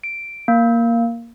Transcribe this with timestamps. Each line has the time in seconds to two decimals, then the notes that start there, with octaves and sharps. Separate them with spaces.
0.04 D7
0.48 A#3